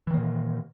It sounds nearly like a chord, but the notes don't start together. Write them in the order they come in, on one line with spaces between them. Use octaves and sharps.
E3 D#3 A#3 A#2